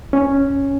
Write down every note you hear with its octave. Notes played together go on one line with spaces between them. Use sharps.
C#4